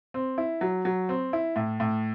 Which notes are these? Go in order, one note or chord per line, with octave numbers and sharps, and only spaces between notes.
C4
E4
F#3
F#3
C4
E4
A2
A2